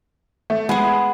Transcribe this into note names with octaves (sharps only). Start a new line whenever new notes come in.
A3
G#3 B3 G#4